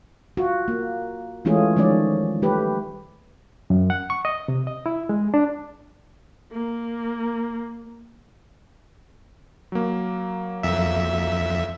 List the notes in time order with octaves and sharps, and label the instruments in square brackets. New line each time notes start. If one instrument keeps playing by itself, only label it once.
[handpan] F4 F#4
A#3
E3 G#3 A3 C#4 F4 G#4
D#3 F3 G#3 C#4 D5
G3 A3 G4 B4
[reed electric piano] F#2
F#5
C#6
D#5
C3
D#5
E4
G#3
D4
[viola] A#3
[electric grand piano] F#3 A#3
[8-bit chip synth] F2 E5